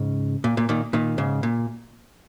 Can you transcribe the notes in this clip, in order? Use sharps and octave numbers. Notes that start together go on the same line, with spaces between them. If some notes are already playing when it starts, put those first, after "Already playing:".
Already playing: G#2 C#3
A#2
A#2
A#2 D#3
A#2 D#3
G#2 C#3
A#2